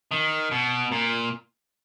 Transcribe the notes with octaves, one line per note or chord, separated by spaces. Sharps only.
D#3
B2
A#2